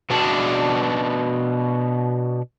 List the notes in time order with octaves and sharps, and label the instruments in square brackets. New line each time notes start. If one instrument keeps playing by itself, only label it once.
[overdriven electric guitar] B2 D4